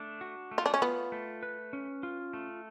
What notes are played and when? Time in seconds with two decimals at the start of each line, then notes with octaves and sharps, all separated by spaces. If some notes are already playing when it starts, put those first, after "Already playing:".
Already playing: A3 D4
0.21 F#4
0.51 A3
0.58 F4
0.66 D4
0.74 C#4
0.82 B3 F4
1.12 A3
1.43 B4
1.73 C#4
2.03 F4
2.33 A3